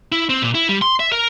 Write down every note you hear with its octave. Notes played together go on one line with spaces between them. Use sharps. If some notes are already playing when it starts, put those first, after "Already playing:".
E4
C4
A#2
E4
G3
C6
E5
A#4